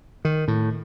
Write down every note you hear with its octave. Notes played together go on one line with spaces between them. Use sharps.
D#3
A2